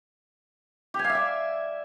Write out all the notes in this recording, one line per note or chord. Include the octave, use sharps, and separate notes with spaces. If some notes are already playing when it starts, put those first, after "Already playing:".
G4
G#5
F5
E5
D5